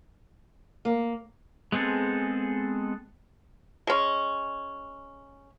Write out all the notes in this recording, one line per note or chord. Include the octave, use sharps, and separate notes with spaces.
A#3
G#3 B3 C4 G#4 A4
G#3 C#4